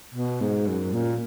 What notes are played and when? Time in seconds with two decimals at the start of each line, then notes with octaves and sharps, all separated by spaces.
0.14 B2
0.41 G#2
0.67 F#2
0.93 A#2